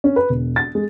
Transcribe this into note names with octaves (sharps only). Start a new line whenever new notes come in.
C#4
B4
E1
A6
G#3